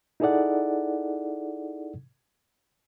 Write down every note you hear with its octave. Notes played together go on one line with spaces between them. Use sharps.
D#4 E4 G#4 A4 D5 F#5